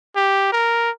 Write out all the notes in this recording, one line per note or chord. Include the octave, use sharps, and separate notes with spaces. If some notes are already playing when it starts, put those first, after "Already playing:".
G4
A#4